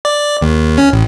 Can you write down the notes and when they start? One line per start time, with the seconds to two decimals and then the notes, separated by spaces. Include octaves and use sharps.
0.05 D5
0.42 D#2
0.78 C#4
0.93 A1